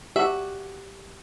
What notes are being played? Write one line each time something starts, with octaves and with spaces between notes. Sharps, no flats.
F#4 G4 E5